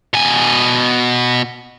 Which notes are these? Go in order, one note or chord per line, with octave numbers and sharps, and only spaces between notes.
B2 G#5